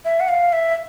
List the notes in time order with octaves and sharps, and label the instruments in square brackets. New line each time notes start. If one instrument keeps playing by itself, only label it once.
[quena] E5
F#5
F5
E5